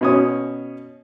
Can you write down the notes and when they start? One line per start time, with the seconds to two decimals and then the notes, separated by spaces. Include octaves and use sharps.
0.01 B2 C#4 D#6